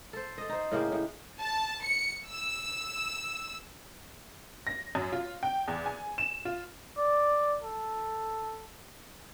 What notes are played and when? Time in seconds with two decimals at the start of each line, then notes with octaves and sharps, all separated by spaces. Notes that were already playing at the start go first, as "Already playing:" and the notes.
0.13 A4 C5
0.38 A4 D#5
0.49 D#4 C5
0.72 A2 C#3 A#3 G4
0.92 A2
1.39 A5
1.83 C#7
2.28 E6
4.67 A#6
4.95 F#2
5.12 F4
5.43 G5
5.68 E2
5.86 G#5
6.18 E7
6.45 F4
6.98 D5
7.62 A4